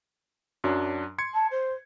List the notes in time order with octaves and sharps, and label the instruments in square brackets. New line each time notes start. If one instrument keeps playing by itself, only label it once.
[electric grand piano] F#2 F#3 D4
C6 G#6 C#7
[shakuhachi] A5
C5